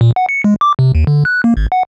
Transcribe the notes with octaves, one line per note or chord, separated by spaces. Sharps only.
A#2
F#5
C#7
G#3
D6
C3
D#2
D3
F#6
A#3
G#1
F#5